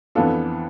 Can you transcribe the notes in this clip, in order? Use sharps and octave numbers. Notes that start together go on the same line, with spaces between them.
F2 E3 B3 D4 F4 A4